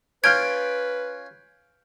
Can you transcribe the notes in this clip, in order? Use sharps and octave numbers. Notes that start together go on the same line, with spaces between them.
C#4 F4 B4 F6 G6 G#6 D7